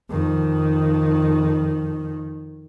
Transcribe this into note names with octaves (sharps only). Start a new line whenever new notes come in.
F2 D#3